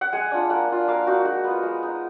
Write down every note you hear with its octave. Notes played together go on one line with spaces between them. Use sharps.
F#5
G#3 G#5
D4 F4
A#3 F#5
D4 F4
A#3 F5
D#4 F#4
G#3 F#4
B3 F4
G#3
D#4